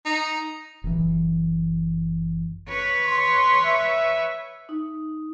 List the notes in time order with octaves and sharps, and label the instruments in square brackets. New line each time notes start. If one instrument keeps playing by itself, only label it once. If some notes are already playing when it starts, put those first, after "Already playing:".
[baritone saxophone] D#4
[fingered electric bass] F#1 E3
[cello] B4 C#5
[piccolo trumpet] C6
E5
[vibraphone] D#4